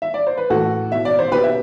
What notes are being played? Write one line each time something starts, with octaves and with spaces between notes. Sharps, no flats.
E5
D5
C5
B4
A2 E3 F#4 A4
B2 E5
D5
C5
B2 G4 B4
E5